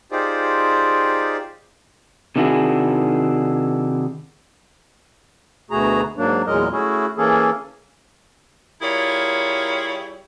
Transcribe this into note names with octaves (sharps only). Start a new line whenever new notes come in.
D#4 F4 G4 G#4 C5 D5
C3 D#3 D4 E4 F#4 G#4
D2 B2 A3 F#4 G#4 A#5
G#2 F#3 A#3 D4
E2 A#2 F#3 G#3 A#4 D#5
A3 C#4 E4 F#4 G#4
E3 A#3 C#4 G#4 A4
G3 E4 F4 G#4 A#4 C#5